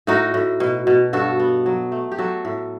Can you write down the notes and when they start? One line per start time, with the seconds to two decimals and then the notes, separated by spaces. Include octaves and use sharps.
0.07 A2 D#4 F#4
0.34 A2
0.60 B2
0.87 B2
1.13 G2 F#4 A4
1.39 B3
1.66 F#3
1.92 A3
2.12 G4
2.18 F#3 F#4 A4
2.45 A2